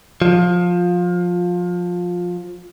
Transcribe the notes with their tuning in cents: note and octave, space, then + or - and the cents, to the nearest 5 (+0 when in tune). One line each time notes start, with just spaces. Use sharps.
F3 +20